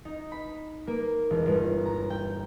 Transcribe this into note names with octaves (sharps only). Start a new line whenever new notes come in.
D#4
B5
A#3
E1
G1
A#5
G5